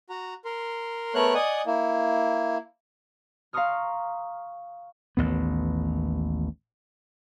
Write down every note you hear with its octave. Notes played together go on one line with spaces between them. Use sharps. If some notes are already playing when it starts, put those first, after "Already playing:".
F#4 A#5
A#4 C6
A3 B3 A#4 C#5 F#6
D5 D#5 F#5 G#5 D#6
A#3 E4
F5 A#5 C6 C#6 D#6 F6
A1 D#2 B3